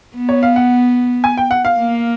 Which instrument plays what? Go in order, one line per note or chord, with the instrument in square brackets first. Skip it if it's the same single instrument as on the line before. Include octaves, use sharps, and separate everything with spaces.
[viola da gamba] B3
[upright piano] C#5
F5
F#5
G#5
G5
F#5
F5
[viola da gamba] A#3